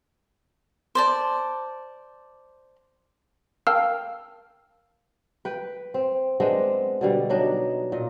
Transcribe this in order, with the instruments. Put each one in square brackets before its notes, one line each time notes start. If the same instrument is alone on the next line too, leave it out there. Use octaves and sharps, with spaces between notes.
[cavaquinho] C5 D5 A5
[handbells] A#4 F5 G5 A5 E6 F6
[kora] B4 G5
C4
G#3 B3 C4 D4
B2 D3 G3
F#3 B3 D4 D#4
A#2 D#5